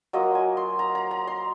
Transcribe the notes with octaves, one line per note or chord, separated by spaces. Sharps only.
F#3 A#3 F4 D#5
G#5
C6
A#5
A#5
A#5
C6